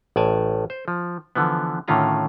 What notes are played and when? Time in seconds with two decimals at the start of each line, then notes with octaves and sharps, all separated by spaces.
0.16 A1 A2 D5 G#5 A5
0.70 C5
0.88 F3
1.35 D3 E3 F3 B3
1.88 A2 D3 D#3 C#4 F4 A#5